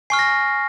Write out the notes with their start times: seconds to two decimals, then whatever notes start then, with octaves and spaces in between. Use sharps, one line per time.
0.10 G#5 C#6 F6 C7
0.19 A#6